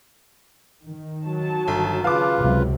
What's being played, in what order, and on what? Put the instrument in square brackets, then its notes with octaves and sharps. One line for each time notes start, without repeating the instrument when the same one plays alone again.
[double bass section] D#3
[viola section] F#3 A5
[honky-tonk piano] G1
[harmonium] C#3 F4 B4 [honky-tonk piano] F5 D6
[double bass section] C#2 C3 F#3